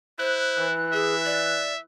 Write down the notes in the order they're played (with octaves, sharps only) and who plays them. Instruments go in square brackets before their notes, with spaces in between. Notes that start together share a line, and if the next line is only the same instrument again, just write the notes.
[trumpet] E4 [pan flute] C5 [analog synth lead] F#6
[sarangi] E3
[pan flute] G#4 [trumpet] E5
[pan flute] D5